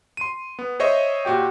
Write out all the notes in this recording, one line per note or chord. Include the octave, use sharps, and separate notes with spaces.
C6 D#7
B3
C5 C#5 D#5 E5 C#6
A#2 F#4 G4 G5